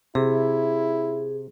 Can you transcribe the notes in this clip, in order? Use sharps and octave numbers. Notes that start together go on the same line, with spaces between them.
C3 E4 G#4